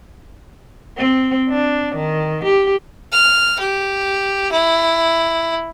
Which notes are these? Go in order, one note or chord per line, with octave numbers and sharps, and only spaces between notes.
C4
D4
D#3
G4
F6
G4
E4